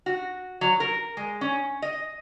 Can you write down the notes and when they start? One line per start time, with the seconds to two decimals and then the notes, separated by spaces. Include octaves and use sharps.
0.06 F#4
0.61 F#3
0.80 A#4
1.17 G#3
1.41 C#4
1.82 D#5